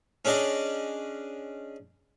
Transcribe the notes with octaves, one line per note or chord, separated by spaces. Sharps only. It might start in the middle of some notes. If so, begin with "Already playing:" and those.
C#4 D4 G#4 D5 D#5